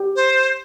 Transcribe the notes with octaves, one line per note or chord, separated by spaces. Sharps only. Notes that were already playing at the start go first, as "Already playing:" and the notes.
Already playing: G4
C5